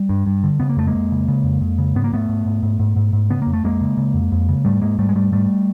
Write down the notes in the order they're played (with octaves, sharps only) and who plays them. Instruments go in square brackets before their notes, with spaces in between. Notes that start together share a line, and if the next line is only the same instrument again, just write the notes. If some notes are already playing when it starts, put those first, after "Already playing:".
Already playing: [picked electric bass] G3
G2
G2
D3
C#3 B3
A#3
F2 A3
G#3 A#3
F2
C#3
C#3
F2
F2
C#3
G#2 B3
A#3
G#2 A3 B3
G#2
G#2
G#2
G#2
G#2
G#2
C#3 B3
F2 A#3
A3
F2 G#3 A#3
C#3
C#3
F2
F2
C#3
G#2 G3 A3
G#2 G#3 A#3
G#2 G3 A3
G#3
G#2 G3 A3
G#2 G3 A3